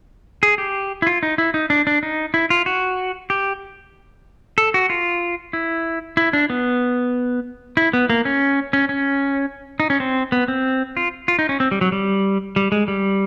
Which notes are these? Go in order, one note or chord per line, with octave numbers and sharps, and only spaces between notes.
G#4
G4
E4
F4
D#4
E4
D#4
D4
D4
D#4
E4
F4
F#4
G4
A4
F#4
F4
E4
E4
D4
B3
E4
B3
A#3
C#4
C#4
C#4
D#4
C#4
C4
B3
C4
F4
F4
D#4
C#4
C4
G3
F#3
G3
G3
G#3
G3